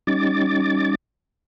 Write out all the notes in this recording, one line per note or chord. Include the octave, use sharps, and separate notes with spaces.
G3 C#4 D#4 D6 A6